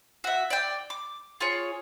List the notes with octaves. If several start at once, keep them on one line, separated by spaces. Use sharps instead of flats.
F#4 E5
D5 G5
D6
F4 G#4 C#5